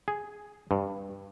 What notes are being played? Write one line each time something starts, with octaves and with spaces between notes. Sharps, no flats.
G#4
G2